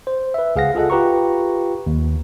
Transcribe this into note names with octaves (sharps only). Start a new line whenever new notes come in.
C5
B4 E5
C#2 G#4 F5 F#5 A#6
F4 G#4 A4 D#5 F#5
F4 G4 B4 A#5 C#6
D#2